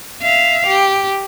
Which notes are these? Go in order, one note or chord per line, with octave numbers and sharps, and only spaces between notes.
E5 F5
G4